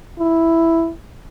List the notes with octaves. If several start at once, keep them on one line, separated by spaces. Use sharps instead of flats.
E4